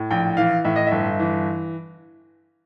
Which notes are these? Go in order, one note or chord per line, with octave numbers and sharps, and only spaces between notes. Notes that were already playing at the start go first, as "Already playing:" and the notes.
Already playing: A2
A#1 G5
E3 F5
A2 E5
D#5
G1 E5
E3